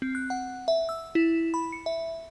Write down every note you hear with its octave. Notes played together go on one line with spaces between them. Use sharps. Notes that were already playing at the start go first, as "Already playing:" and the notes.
C4
F#6
F#5
E5
E6
E4
B5
C#7
E5